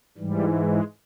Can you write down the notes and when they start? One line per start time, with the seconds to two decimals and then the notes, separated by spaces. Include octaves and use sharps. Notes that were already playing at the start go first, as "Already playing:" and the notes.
0.18 G#2 E3 G3
0.57 G#3